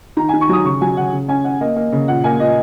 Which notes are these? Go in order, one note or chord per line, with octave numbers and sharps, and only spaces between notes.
D#3 A#5
D#3 G#5
C#6
F#3 D#6
C#3 C#6
F#3 G#5
C#3 F#5
C#3
C#4 G#5
C#4 F#5
A#3 D#5
A#3
C#3
A#2 F#5
A#3 G#5
A#2 D#5